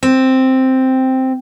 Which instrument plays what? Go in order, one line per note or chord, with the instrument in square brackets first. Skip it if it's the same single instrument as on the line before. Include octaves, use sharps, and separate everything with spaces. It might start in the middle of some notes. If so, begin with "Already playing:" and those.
[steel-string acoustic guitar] C4